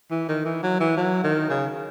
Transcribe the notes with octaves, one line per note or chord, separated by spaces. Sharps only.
E3
D#3
E3
F#3
E3
F#3
D#3
C#3